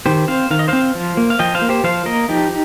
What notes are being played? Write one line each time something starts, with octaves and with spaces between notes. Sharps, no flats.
D#3 G4 C5
C4 C5 F5
D#3 F5
D#5
C4 C5 F5
F3
A#3
F5
F3 D#5 G5
C5 F5
A#3
G4 C5
F3 C5 F5
A#3 A#4 D#5
F3 D#4 G4